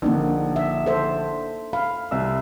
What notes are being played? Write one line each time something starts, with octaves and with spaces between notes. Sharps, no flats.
A#1 D3 A#3 D4 D#4
E5
A4 C5 E5
F5 B5
C2 E5 E6